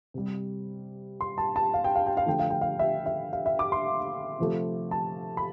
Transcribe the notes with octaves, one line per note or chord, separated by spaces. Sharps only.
C3 G3
C6
A5
A5
F5
G5
F5
G5
F5
D3 F3 A3 G5
F5
G5
F5
E5
E5
F5
E5
D6
C6
C3 F3 A3
A5
B5